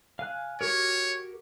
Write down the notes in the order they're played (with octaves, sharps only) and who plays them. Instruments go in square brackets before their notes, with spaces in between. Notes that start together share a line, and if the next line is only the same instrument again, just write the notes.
[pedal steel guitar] F5 G#5 F#6
[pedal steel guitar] F#4 G4 A#4 [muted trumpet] C#5